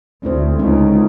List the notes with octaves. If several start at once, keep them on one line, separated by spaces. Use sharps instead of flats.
D2 C4 E4 C5
C#2 A3 C4 D#4